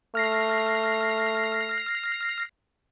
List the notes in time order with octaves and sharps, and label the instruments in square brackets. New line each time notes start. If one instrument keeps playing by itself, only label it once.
[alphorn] A3 [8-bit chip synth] F6 A#6 C7